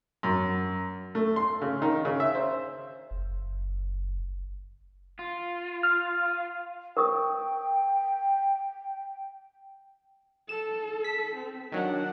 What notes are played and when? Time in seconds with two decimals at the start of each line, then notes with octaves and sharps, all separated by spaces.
0.23 F#2
1.15 A3
1.36 C6
1.62 C#3
1.82 D#3
2.05 C#3
2.20 E5
2.35 C5
3.11 F#1
5.19 F4
5.83 F6
6.97 A#4 G5 C#6 D#6
10.49 A4 E7
11.04 B6
11.36 C4
11.72 D#3 F#3 D4 F#5